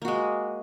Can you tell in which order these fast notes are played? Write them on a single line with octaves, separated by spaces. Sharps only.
A#3 F#4 G#3